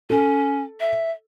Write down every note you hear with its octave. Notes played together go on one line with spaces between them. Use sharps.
C#4 A4
E5